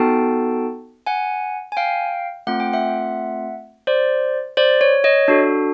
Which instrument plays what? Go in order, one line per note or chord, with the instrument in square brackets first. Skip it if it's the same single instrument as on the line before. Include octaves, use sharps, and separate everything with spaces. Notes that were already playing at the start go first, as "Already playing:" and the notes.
Already playing: [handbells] B3 D#4 F#4 A4 G5 A5
F#5 G#5
G#5
F5 G5
A3 C4 F4 F#5
G5
E5 F#5
C5 D5
C5 D5
C#5
C#5 D#5
D4 F#4 A4